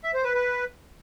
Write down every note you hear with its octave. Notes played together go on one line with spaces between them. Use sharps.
E5
C5
B4
B4